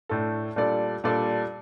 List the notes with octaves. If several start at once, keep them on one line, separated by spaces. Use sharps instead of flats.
A2 A3 D4 A4
A#2 G3 D4 A4 D5
A#2 G3 D4 A4 D5